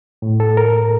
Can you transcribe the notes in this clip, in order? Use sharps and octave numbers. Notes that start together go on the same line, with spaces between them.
A2
A4
A#4